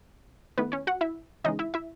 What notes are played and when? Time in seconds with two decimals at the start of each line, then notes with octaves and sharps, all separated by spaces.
0.58 D#3 A3 B3 E4 B4
0.72 C#4 C#5
0.87 F#4 F#5
1.01 E4 E5
1.44 C#3 E3 G#3 D#4 D#5
1.59 E4 E5
1.74 E4 E5